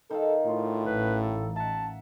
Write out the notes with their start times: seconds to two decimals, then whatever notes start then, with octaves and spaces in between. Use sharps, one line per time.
0.11 D#3 D#4 A4 F5
0.46 A2 F4
0.86 A1 B4
1.22 A4
1.56 E5 F#5 A5